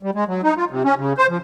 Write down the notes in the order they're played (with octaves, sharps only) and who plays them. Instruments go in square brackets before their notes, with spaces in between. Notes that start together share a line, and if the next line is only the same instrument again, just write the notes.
[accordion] G3
G#3
F#3
D#4
F4
C3
C#4
C#3
C5
F3